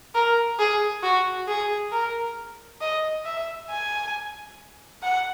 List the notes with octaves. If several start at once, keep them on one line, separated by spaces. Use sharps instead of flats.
A#4
G#4
F#4
G#4
A#4
D#5
E5
G#5
F#5